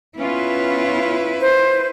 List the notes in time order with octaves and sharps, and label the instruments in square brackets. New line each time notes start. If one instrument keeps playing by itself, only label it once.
[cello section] B3 C#4 F4 [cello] E4 B4
[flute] C5